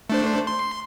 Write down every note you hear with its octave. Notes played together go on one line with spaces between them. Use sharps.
A3 D4 C5
C6